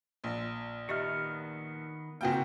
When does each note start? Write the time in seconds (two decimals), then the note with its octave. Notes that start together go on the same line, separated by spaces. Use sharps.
0.24 A#1
0.89 D#3 B3 G4 D#5 E5 F6
2.21 F#1 A#3 C4 F#4 G5 G#5